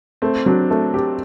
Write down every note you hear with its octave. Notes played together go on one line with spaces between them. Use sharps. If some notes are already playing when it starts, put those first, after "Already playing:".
A3 C4
F#3 D4
A3 A4
G4